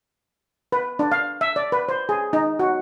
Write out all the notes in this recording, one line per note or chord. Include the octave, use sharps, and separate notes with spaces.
B4
D4
F5
E5
D5
B4
C5
G#4
D#4
F#4